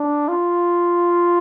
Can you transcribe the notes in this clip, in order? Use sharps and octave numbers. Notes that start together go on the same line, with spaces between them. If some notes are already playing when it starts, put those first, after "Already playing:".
Already playing: D4
F4